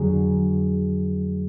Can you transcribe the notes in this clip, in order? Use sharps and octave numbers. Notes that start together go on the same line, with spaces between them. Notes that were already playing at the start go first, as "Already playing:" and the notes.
Already playing: F2 D3 F#3 G#4